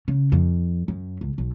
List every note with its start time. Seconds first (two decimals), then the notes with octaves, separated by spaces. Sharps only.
0.08 C#3
0.32 F2
0.88 F#2
1.21 C#2
1.38 B1